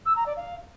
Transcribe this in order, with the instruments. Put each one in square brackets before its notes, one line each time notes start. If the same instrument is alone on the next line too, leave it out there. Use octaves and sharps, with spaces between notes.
[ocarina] E6
A#5
D5
F5